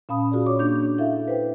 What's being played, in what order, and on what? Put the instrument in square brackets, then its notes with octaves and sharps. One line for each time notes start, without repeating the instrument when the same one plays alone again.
[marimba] A#2 C#4 F5 A5 B5 D#6
F4 F#4 G#4 A#4 D5
C#5 C#6 D6
A#3 D4 G6
E4 A4 E5 F5
B4 C5 G5